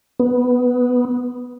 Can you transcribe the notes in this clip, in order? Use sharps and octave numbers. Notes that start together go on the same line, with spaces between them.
B3